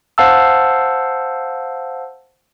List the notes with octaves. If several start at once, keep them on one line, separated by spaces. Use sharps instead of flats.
C5 F5 F#5 A5 E6